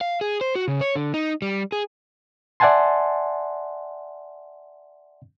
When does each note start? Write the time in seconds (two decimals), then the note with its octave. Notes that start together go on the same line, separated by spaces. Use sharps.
0.01 F5
0.21 G#4
0.41 C5
0.55 F#4
0.68 C#3
0.81 C#5
0.96 D3
1.14 D#4
1.42 G3
1.72 G#4
2.60 D5 E5 F#5 G#5 A5 C6